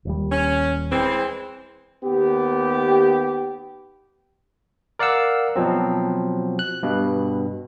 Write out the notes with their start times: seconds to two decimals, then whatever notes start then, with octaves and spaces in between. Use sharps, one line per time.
0.05 D#1 D#2 G3
0.31 C#4
0.90 E3 G#3 C4
2.03 D#2 B3 G4
4.99 A#4 D5 F5 F#5 E6
5.56 B2 F3 F#3 C4
6.59 F#6
6.83 G2 B2